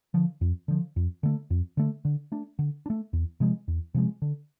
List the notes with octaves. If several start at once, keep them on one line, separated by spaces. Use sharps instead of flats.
D3 F3
F2
D3 F3
F2
D3 A3
F2
D3 A3
D3
A3 D4
D3
D4
A3
E2
C3 F3 G#3
E2
C3 F3 G#3
D3